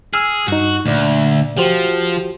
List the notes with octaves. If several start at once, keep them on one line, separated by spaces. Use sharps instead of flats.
G#4 E6 F6
G2 D#4 F#4
D2 A#2 D5
F3 F#4 G4 C5